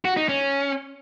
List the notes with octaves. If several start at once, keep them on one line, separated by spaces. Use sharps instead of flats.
F#4
D#4
C#4